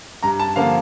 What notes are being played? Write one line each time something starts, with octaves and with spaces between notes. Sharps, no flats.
G2 A#5
A5
D3 F3 A#3 F5